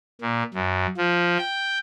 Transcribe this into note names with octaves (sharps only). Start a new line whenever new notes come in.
A#2
F#2
F3
G5